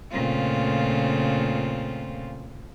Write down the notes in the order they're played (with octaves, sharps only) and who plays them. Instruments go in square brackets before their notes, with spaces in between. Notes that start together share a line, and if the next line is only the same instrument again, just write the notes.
[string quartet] A#2 C#3 A3 C4 F4